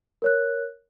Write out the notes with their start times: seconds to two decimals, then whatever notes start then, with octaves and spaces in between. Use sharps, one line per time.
0.22 A#4 C#5 F#6